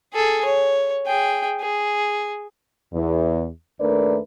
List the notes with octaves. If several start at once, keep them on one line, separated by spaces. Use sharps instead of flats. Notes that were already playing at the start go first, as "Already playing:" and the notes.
G#4 A4
C#5
G#4 G5
G#4
E2
D#2 A3 D4 A#4 B4 D5